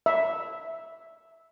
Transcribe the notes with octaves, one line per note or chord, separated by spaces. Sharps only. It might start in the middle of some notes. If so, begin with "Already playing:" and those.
E5